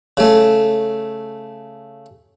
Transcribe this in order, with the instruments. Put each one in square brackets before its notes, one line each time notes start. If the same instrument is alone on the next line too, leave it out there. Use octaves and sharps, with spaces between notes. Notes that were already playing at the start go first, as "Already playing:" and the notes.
[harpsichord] C#3 A3